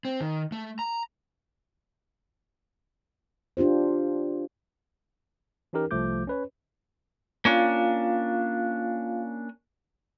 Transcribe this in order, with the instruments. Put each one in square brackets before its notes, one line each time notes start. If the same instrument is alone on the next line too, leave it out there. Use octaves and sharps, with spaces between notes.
[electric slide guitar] C4
D#3
A3
A#5
[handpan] D4 F4 G4 C5
[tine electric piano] E3 C#4 D#4 G4 A#4
C2 F3 A3 D6 G6
C#4 B4 C#5
[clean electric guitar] A#3 C#4 D4 [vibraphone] F4 F5